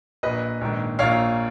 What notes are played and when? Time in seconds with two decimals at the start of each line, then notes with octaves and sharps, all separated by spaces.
0.23 A#1 A#2 B4 D#5
0.61 A#1 G#2 D#3
0.99 A#1 A#2 C#5 F5